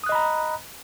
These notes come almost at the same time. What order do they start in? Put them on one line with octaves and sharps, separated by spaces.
D#6 F#6 D#5 B5 A#5